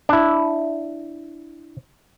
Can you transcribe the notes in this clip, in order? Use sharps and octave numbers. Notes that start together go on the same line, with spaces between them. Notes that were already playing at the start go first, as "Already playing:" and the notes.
D4 E4